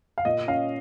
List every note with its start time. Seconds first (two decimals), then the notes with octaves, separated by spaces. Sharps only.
0.18 F5
0.25 A#2 D#5
0.48 C#4 F5